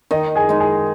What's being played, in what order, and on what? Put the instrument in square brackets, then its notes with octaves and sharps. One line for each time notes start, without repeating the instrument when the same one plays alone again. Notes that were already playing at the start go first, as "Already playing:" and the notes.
[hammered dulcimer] D#3 [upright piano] D#4 D#5
[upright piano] G#4 G#5
[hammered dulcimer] G#3 D#4
[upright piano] G#4 G#5